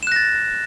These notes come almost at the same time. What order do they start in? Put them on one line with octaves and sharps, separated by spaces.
E7 F#6 A#6 A6